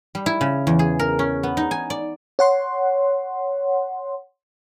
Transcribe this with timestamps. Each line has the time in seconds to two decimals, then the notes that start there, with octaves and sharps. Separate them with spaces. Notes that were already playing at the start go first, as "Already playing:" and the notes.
0.15 G3
0.26 E4
0.41 C#3
0.67 E2
0.79 G#4
0.99 A#4
1.19 C#4
1.43 B3
1.57 D#4
1.71 G#5
1.90 D5
2.39 C#5 F#5 C6